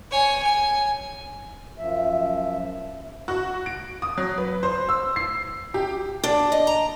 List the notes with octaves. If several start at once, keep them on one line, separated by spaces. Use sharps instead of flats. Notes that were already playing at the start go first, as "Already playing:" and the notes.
C#5 G#5
G#5
F#2 F3 E5
F#4
D7
D#6
F#3
B4
C5
E6
C7
G4
D4
D#5
A#5